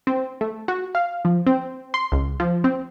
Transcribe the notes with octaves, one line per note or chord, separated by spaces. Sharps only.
C4
A3
F#4
F5
F3
C4
C6
C#2
F3
C4